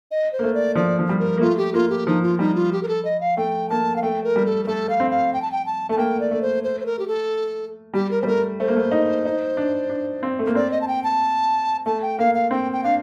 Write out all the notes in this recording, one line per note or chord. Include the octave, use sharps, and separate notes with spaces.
D#5
C5
A#3
A3
D5
F3 D5
F3
G3
A#4
A#3
A3 F4
G4
A#3 F4
G4
F3 D#4
F4
G3 D#4
F4
G4
A#4
A4
D#5
F5
A3 G5
A#3 A5
F5
A3 G5
A#4
G3
A4
A#4
A3 A4
F5
C4
F5
G5
A5
G5
A5
A3 A5
A#3 G5
D5
A3
C5
C5
C5
A#4
G4
A4
G3 G4
A#4
G3 C5
A3 A#4
A3 C5
A#3
A3
D#4
D#4
D4
D4
C4
A3
A#3
C4 D5
D#5
A5
G5
A5
A3 A5
G5
A#3 F5
F5
C4 G5
G5
D4 F5